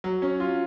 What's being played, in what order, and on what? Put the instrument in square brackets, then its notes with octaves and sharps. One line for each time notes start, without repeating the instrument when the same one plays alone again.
[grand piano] F#3
C#4
F4